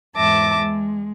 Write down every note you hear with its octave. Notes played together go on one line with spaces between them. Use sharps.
E2 G#2 E5 A5 D6 A#6
G#3